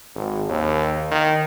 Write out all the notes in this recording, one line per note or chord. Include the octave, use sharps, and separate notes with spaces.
G#1
D#2
D#3